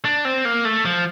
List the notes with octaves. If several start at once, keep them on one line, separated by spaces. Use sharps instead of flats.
D4
C4
A#3
A3
F3